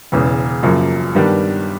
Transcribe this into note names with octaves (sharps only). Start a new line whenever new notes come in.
E1 E2 C#3
F#2 C#3 F3 A#3
G2 D#3 G3 B3 D4